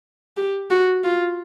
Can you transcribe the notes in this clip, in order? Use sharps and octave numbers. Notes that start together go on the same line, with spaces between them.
G4
F#4
F4